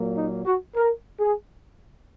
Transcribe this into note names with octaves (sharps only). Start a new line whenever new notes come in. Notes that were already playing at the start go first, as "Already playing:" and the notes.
Already playing: A#2 F#3 A#3
D#4
F#4
A#4
G#4